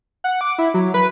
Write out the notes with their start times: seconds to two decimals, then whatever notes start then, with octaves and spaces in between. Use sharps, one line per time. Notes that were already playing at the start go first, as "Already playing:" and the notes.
0.24 F#5
0.41 D6
0.58 E4
0.74 F#3
0.94 B4